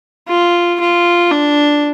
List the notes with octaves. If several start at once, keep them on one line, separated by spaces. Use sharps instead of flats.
F4
F4
D4